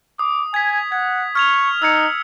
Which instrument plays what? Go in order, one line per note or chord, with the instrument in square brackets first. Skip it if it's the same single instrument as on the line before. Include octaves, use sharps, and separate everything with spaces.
[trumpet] D6 [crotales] D#6
[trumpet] G#5 [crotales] G#6 B6
[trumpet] F#5 [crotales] G#6
[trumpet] C#6 [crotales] F6 G#6 F7
[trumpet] D#4 [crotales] E6 G#6 C#7